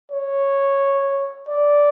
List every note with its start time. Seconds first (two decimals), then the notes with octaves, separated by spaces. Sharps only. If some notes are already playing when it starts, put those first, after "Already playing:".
0.11 C#5
1.47 D5